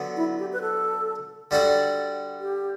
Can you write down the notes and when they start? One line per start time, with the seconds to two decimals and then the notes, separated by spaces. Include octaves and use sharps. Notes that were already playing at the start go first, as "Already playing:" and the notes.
Already playing: D3 F#3 B3
0.17 E4
0.39 G4
0.53 B4
0.61 A4
1.51 D3 G3 D4 F#4 A4
2.41 G4